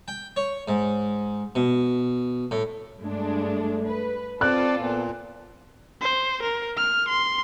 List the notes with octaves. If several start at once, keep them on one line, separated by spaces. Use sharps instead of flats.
G5
C#5
G#2
B2
A2
G2 G#3 A3 D4
B4
C4 F4 A4 D5 F#6
A#2 B3
C5
A#4
F6
C6